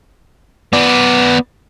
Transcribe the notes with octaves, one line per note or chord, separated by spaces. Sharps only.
B3 D5